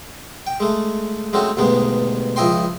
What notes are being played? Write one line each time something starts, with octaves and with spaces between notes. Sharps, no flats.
G5
G#3 A3
G#3 A3 C4 C#4 F#4
D2 G2 B2 D#3 G#3 B3
C#2 F3 E4 D#5 G5 C6